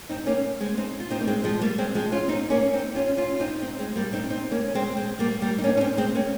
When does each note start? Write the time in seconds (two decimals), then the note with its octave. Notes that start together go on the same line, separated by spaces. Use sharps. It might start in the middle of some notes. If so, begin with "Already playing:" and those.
0.09 C4 D#4
0.26 A#3 C#4
0.61 G#3 C4
0.77 C4 D#4
1.00 F4
1.10 C4 D#4
1.21 A#3
1.27 G#3 C4
1.44 F3 G#3
1.61 G3 A#3
1.78 G#3 C4
1.95 F3 G#3
2.12 C#4 F4
2.28 C4 D#4
2.50 A#3 C#4
2.74 C4 D#4
2.95 C#4 F4
3.17 C#4 F4
3.36 F4
3.40 C4 D#4
3.62 C4 D#4
3.79 G#3 C4
3.96 G3 A#3
4.13 C4 D#4
4.30 C4 D#4
4.52 A#3 C#4
4.68 C#4
4.75 G#3 C4
4.97 G#3 C4
5.19 G3 A#3
5.41 G3 A#3
5.58 D#4
5.64 A#3 C#4
5.77 C#4
5.81 C4 D#4
5.97 G#3 C4
6.15 A#3 C#4